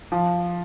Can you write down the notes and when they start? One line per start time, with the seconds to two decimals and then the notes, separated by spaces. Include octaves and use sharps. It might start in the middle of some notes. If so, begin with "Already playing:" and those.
0.12 F3